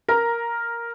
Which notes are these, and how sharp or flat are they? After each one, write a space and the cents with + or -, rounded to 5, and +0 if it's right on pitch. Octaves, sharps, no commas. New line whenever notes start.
A#4 +0 A#5 +5